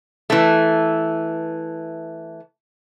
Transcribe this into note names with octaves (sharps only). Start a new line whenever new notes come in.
E3 A3